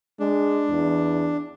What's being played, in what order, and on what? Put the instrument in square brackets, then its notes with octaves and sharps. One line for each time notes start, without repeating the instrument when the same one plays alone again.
[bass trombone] G#3 [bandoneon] D4
[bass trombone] E2